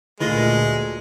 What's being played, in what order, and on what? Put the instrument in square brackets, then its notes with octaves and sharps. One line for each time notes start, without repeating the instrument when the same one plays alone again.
[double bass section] D2 A#2 [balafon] D3 [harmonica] G#3 [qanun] A3 F4 D#5